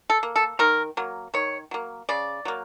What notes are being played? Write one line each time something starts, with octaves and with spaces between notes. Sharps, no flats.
A4
A#3
A4
D#3 A#4
F#3 A#3
D#3 C#5
F#3 A#3
C#3 D5
F#3 A#3